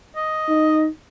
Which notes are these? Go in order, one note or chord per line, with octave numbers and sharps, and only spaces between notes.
D#5
D#4